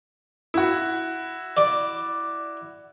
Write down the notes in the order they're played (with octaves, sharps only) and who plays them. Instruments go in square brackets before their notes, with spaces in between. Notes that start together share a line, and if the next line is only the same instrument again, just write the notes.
[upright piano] E4 F#4
[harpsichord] D5